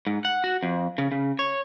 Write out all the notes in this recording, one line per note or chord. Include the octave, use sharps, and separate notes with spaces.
G#2
F#5
F#4
F2
C#3
C#3
C#5